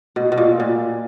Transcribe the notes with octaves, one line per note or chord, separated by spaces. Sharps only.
B2
B2
A#2
A#2